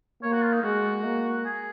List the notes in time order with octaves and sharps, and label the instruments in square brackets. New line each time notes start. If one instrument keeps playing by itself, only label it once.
[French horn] A#3 [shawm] C#5
[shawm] F#4
F4
D#4
[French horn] G#3 [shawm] F#4
[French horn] A#3
[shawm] G#4